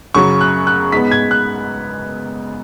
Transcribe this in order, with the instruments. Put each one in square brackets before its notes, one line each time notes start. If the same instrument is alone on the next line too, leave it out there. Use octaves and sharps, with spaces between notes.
[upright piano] F#2 C#3 F#3 C#6
F#6
F#6
G#2 G#3 B3 B6
G#6
F#6